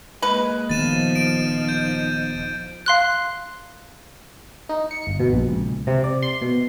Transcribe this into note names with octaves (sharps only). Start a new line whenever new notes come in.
G#3 A#3 B4
D#1 D#3 F3 B3 D#4 A6 D#7 E7
D7
G6
F5 C6 F#6
D#4
C#7
G1
B2
A#1
C#2
C3
D5
C6
B2